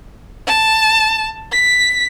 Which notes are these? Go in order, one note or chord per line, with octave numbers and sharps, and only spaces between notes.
A5
B6